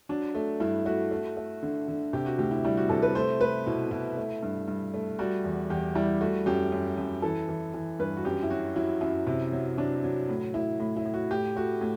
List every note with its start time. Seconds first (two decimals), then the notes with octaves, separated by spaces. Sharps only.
0.09 F#3 D4
0.35 A3
0.60 G2 E4
0.85 A3 F#4
1.11 A3
1.37 A3
1.63 D3
1.88 D3
2.13 C3 G4
2.26 F#4
2.38 D2 G4
2.51 E4
2.64 G3 E4
2.77 F#4
2.89 C3 A4
3.02 B4
3.15 A3 C5
3.40 A3 B4
3.66 B2 E4
3.91 B2 E4
4.17 A3
4.43 G2
4.68 G2
4.94 A3
5.19 G3 F#4
5.44 E2
5.70 E2 G4
5.95 G3 E4
6.21 A3 F#4
6.46 F#2 G4
6.72 F#2
6.97 F#2
7.22 E3 A4
7.49 E3
7.74 E3
7.99 G2 B4
8.17 F#4
8.25 F#2 G4
8.43 E4
8.50 F#3 F#4
8.76 F#3 E4
9.01 F#2 E4
9.27 C3
9.52 F#3
9.78 F#3 D4
10.04 F#3
10.29 A2
10.54 A2 E4
10.80 A2
10.97 E4
11.05 A2
11.14 F#4
11.31 A2 G4
11.56 A3 F#4
11.81 A2